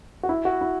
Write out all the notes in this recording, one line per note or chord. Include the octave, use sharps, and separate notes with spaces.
F#4
E4
F#4
E4